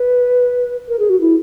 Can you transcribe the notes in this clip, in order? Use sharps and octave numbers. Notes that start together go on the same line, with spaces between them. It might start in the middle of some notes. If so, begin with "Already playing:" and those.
Already playing: B4
A#4
G#4
F#4
E4